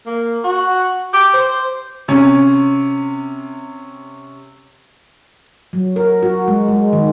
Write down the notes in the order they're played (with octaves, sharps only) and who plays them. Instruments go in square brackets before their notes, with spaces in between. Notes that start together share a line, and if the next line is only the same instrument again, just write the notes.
[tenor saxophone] A#3
F#4
G4
C5
[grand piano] C3 C#4
[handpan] F#3
A#4
F#4
G#3
G#3
D#3